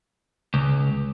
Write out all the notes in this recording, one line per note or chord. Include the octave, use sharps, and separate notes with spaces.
C#2